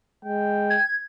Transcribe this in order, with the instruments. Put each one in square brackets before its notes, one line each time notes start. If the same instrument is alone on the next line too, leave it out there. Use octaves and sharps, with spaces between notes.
[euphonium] G#3 [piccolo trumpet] G5
[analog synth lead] G#6